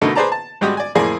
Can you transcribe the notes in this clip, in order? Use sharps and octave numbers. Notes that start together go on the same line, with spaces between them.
B2 D3 A3 D#4 A#4
G#4 B4 C5 D5 A5 A#5
A5
G#1 G3 G#3 F#4 G4 D#6
D5 G#5
F2 A2 A#3 G#4 D5